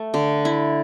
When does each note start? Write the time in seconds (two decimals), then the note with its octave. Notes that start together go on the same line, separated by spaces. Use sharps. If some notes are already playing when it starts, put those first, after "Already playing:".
Already playing: A3
0.14 D3
0.45 E4